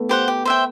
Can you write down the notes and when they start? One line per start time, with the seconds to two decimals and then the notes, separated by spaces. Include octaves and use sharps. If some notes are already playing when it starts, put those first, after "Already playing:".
Already playing: A3 B3
0.09 G4 C5 F#5
0.28 G4
0.45 C5 E5 G5